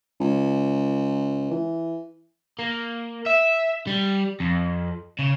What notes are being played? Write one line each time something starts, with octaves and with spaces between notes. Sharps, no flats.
C#2
E3
A#3
E5
G3
F2
C#3